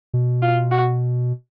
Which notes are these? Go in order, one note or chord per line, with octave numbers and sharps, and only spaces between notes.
B2
F4
F#4